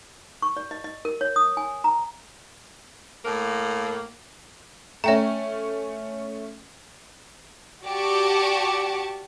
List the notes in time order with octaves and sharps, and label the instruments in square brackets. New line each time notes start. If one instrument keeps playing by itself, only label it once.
[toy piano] C#6
D5
D#5
D#5
A#4
C#5
D#6
G#5
A#5
[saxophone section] A2 A#3
[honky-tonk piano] A3 C#4 [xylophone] E5 G5 A#5
[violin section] F#4 G4 D5 A5 C#6 D6